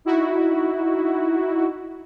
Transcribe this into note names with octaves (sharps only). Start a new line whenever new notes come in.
D#4 E4 F#4